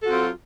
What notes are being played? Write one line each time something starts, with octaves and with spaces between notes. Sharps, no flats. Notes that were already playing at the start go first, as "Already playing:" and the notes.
F#3 C4 F4 F#4 A4